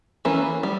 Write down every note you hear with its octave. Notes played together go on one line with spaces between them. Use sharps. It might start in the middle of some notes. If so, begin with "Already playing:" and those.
E3 A#3 C#4
G3